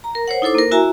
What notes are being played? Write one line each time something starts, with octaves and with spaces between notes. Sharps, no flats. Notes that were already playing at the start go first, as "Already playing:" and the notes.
A#5
A#4
C5 C#5 F#5
D#4 E4 A4 C5 D6
A#3 A#4
E4 F#4 E5 G#5 A#5